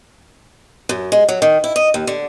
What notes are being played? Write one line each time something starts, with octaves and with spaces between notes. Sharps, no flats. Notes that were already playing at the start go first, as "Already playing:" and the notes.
F#2
G#3
F#3
D#3
E4
D#5
D#2
D3